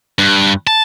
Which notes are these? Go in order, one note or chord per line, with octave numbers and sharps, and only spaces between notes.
G2
A5